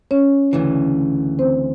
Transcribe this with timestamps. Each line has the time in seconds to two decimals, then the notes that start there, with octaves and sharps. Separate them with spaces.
0.11 C#4 C#5
0.53 D2 C#3 E3
1.39 C4 C5